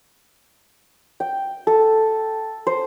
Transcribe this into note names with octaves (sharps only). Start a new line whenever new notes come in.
G5
A4
C5